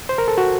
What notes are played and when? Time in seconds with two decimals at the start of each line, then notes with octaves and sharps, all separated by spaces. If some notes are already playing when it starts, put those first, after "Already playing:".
0.09 C5
0.18 A#4
0.28 A4
0.38 F#4